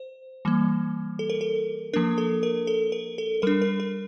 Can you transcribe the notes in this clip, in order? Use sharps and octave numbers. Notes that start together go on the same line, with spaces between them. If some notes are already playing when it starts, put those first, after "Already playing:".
Already playing: C5
E3 G3 A#3
A4
A#4
A4
F3 A#3 D4 A#4
A4
A#4
A4
A#4
A4
G3 D4 A#4
A#4
A#4